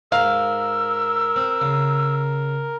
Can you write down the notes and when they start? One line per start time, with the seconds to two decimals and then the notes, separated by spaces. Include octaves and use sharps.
0.12 G#2 A#4 F5 E6
1.36 C4
1.61 C#3